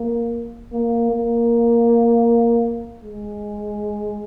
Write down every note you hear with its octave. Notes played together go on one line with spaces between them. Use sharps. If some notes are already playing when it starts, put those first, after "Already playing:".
Already playing: A#3
A#3
A#3
G#3